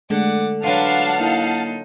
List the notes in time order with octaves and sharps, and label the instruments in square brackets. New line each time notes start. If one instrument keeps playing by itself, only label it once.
[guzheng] D3 [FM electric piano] G#3 A3 [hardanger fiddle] D5 F#5
[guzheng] F#3 F4 [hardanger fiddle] D4 B4 [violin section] F5 F#5 A5
[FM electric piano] A#3 E4 [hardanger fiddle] D#4